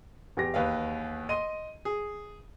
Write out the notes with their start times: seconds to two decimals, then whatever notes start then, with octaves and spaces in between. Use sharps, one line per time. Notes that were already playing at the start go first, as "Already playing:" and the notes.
0.37 E2 G4 A#6
0.54 D#2 B4 F5
1.29 D#5 C6 D#7
1.85 G#4